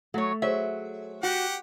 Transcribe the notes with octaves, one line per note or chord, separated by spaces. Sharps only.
F#3 A3 C#5
F#3 G#4 C5 C#5 E5
F#4 G4 F#5